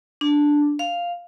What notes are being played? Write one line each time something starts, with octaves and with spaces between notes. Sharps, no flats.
D4
F5